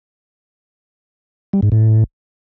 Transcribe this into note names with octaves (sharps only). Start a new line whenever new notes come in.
G3
G#2
A2